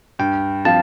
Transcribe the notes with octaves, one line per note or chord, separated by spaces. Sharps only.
G2 G5
F3 C4 F4 A5